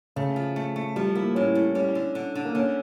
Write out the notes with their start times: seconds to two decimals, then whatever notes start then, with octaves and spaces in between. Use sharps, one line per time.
0.16 C#3 A3
0.36 F3
0.56 A3
0.76 A3
0.96 F3 G3
1.15 A#3 E4
1.35 A2 C#4
1.55 A3
1.75 G3 C#4
1.95 D3
2.15 D3
2.35 D3
2.45 A#3
2.55 D3 C#4